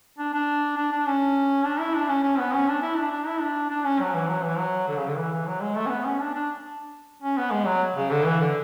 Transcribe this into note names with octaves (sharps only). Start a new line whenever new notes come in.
D4
D4
D4
D4
C#4
D4
E4
D4
C#4
C#4
B3
C#4
D4
E4
D4
D4
E4
D4
D4
C#4
F#3
E3
F#3
E3
F#3
D3
C#3
D3
E3
E3
F#3
G#3
A3
C#4
B3
C#4
D4
D4
C#4
B3
G#3
F#3
C#3
D3
E3
D3